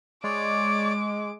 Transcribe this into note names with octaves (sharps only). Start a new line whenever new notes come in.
G#3 C#5 D5 D6